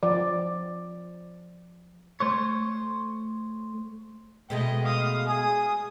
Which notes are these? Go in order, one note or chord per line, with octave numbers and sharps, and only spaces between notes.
F3 D5
A3 C5 C#5
B2 G#3 A3 D#5 G5
F5 D#6
G#4 D#6